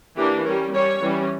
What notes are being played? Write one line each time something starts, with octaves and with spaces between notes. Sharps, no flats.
E3 A#3 D4 G4
G3 C#4 A#4
G3 C#4 C#5
E3 G3 C#4